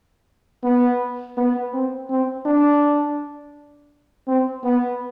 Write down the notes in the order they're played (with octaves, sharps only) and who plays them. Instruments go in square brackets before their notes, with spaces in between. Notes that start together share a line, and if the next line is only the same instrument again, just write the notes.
[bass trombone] B3
B3
C4
C4
D4
C4
B3